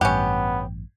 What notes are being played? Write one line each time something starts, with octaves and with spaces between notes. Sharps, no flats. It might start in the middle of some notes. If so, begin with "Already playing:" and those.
A1 G2 B3 C#4 G4 F#5